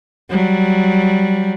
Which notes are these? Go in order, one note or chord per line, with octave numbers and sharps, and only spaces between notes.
F#3 G3